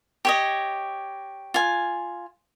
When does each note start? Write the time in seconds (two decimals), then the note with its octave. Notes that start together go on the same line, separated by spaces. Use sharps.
0.25 G4 C#5 D#5
1.54 F4 G#5